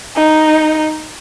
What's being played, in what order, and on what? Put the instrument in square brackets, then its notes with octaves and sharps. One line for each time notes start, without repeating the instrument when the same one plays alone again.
[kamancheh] D#4